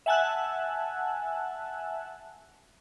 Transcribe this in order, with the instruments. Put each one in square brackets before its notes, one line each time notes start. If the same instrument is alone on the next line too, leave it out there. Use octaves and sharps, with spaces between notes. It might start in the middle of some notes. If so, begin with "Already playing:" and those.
[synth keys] E5 F#5 G#5 A5 E6 F#6